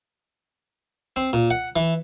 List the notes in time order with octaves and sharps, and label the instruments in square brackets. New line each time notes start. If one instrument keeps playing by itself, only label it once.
[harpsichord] C4
A#2
F#5
E3